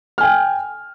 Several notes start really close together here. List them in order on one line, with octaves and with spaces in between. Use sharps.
F6 G#5 G5